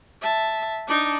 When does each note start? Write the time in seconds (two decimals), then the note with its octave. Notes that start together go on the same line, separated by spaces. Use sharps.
0.21 E5 A5
0.87 D4 D#4